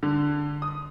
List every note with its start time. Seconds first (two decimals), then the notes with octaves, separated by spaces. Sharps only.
0.03 D3
0.62 D#6